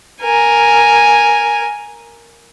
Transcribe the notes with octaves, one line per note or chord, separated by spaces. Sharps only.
A#4 G#5